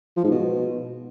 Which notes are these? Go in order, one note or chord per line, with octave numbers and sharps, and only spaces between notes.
F3
G#2
B2